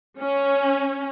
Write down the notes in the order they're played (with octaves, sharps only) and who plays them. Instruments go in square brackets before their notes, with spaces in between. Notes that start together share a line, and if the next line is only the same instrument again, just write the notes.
[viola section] C#4